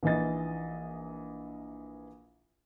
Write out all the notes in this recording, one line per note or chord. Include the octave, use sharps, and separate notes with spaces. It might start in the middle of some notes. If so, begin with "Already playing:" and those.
A#1 E3 D#4 D#5 A6